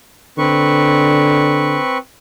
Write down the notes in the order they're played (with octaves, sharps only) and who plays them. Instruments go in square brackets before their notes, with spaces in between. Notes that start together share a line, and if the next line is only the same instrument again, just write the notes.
[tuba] D3 [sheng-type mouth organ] C4 B4 C#6